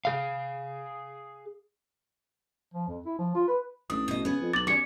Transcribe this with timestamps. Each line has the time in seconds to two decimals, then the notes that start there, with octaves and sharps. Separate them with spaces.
0.05 G#4 F5
2.74 F3
2.88 F2
3.05 E4
3.19 F3
3.35 F4
3.48 B4
3.90 A1 D4 D#6
4.08 B2 D#5
4.25 C#3 B3 G#4
4.41 F2
4.53 B1 D6 A6 F#7
4.67 C#4 G4 D5 D6 C#7